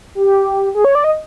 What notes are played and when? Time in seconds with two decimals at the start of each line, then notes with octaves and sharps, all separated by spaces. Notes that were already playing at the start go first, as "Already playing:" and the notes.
0.15 G4
0.75 G#4
0.84 C#5
0.95 D5
1.04 D#5